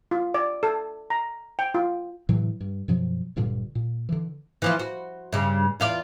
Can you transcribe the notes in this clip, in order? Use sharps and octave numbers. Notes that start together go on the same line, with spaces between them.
F4
D5
A4
A#5
G5
F4
A2 C3 E3 F#3
G2
F#2 B2 F3 F#3
D1 G2 A#2 D3
A#2
D3 E3
E3 F3 F4
F#4
G2 C#3
E2 F4 D5